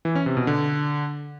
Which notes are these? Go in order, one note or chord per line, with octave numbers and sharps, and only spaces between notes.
E3
C#4
C3
B2
D3